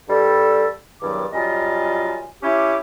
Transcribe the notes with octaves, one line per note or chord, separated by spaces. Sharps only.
G2 G3 A4
E2 G2 D#3 F#3 D6
F#2 G3 F4 D#5 G#5
C#4 E4 G4 G#5 D6